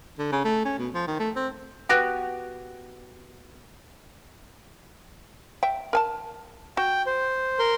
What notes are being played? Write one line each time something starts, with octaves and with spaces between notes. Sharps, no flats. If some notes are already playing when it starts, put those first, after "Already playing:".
D3
C#3
A3
C#4
B2
F3
D#3
A3
C4
B3 F#4 G4
E5 G5
A#4 G#5 A5
F#4 G5
C5
A#4 C6